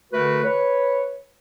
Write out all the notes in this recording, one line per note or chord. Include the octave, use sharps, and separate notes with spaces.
D3 A3 F#4 A#4 B4
B4 C#5